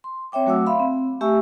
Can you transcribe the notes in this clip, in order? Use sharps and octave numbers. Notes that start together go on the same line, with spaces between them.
C6
C4 C#5 E5 G5 D6
F#3 A3 F#4 F#5 D6 E6
E5 F5 B5 C6
C4
A3 G4 E5 G#5 C#6 E6